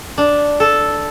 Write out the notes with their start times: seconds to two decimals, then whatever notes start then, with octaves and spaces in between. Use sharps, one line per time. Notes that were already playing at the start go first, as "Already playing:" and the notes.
0.18 D4
0.60 A4